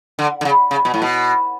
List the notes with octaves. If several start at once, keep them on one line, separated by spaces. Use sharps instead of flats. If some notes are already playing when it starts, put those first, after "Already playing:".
D3
D3
C#3
C#3
B2
A2
B2